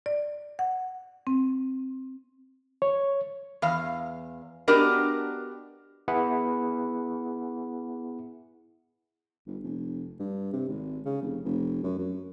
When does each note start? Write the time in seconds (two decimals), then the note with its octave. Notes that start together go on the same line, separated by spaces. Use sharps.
0.06 D5
0.59 F#5
1.27 C4
2.82 C#5
3.62 E2 F5
4.68 B3 D4 F#4 G4 A#4 D#5
6.08 B3 E4 G#4 F#5
9.47 G1
9.63 F1
10.19 G2
10.53 C3
10.68 G#1
11.05 C#3
11.22 F1
11.45 F1
11.83 F#2
11.98 F#2